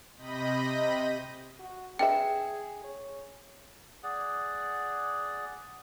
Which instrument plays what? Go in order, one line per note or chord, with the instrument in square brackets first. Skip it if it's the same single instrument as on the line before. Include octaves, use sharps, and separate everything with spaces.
[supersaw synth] C3 D#5 B5 G6 A#6 D#7
[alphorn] F#4
[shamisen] D4 B4 E5 [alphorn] G#4 [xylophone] G5
[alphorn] C#5
[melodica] G#4 D5 F#5